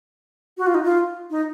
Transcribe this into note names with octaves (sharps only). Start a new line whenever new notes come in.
F#4
F4
D#4
F4
D#4